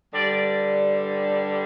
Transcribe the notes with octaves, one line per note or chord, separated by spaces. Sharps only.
G2 D3 G3 D5